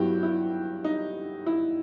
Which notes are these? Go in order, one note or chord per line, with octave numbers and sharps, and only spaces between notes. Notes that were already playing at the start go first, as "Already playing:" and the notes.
Already playing: G2 F#3 B3 E4 F#4 G4
E4
D#4
E4